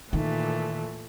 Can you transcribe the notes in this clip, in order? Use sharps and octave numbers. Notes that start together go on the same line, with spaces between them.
A#2 D#3 E3 A3